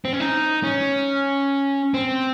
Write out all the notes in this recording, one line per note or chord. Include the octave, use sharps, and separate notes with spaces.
C4
C#4
D#4
C#4
C4